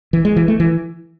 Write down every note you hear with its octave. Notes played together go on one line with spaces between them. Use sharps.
E3
G#3
E3
A3
E3